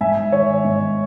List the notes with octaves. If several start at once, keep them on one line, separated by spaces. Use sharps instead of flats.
G#2 E5 G#5
D#3 C#5 E5
G#2